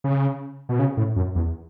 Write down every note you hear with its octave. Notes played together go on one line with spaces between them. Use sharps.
C#3
B2
C#3
A2
F#2
E2